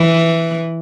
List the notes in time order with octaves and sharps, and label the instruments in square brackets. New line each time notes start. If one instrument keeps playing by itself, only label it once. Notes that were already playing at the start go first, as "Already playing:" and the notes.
Already playing: [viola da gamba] E3